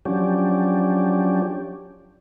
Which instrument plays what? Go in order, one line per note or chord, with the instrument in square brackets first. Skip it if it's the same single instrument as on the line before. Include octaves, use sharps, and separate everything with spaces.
[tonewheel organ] F3 F#3 C#4 D4 G4